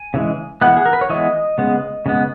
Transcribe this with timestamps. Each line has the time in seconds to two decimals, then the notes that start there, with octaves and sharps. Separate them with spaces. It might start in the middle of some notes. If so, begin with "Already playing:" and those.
Already playing: G#5
0.14 C#3 E3 G#3
0.62 E3 G#3 B3 F#5
0.77 G#4
0.86 A#4
0.93 B4
1.01 C#5
1.10 E3 G#3 B3 D#5
1.58 C#3 G#3 B3
2.06 C#3 G#3 B3